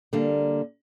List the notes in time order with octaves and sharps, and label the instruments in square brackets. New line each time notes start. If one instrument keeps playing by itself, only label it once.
[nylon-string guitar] D3 G3 A#3